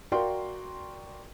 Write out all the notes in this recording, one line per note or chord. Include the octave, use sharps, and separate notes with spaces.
F#4 A#4 D5 F5 G5 C6